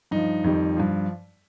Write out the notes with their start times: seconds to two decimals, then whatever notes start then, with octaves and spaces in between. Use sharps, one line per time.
0.11 G2 F3 D#4
0.44 F2 D#3 G3
0.77 G2 F3